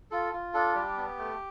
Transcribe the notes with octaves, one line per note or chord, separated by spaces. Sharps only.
F4 A4
F4
D4 A4
G3 G4
B3
A3